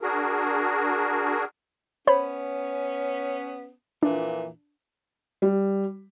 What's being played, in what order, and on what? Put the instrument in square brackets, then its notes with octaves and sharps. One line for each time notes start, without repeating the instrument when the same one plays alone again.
[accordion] D4 F#4 G#4 A#4
[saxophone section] B3 C#4 [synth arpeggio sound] C5 C#5 B5
[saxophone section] F2 A#2 E3 [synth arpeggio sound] D4
[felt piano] G3